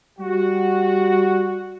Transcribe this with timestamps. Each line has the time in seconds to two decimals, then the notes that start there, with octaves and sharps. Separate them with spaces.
0.19 G3 F#4